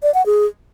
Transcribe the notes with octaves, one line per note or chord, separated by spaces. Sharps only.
D5
F#5
G#4